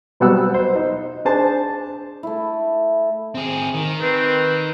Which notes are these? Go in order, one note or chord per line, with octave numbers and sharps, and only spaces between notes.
B2 F#3 G3 B3 F#5 E6
C5
D#4
D4 G#4 C5 A5
A3 E4
C4 G#4
D#3
C4 B4